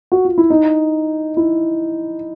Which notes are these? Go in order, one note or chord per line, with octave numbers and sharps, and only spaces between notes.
F#4
F4
E4
D#4
E4